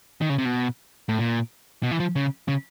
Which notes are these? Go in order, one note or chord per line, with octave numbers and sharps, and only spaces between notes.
D#3
C#3
C3
B2
A2
A#2
B2
E3
F3
C#3
C#3